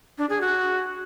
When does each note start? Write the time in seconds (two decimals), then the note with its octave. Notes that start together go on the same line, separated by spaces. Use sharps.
0.18 D4
0.30 G#4
0.41 F#4